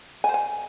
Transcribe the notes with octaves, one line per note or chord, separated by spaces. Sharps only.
G#5
C5
G#5